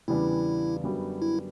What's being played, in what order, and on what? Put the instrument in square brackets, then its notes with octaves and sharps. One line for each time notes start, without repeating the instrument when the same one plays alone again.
[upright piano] E2 C#3 G3 B3 D4 [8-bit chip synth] E4
[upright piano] F#2 D3 G3 B3 F#4
[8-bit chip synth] E4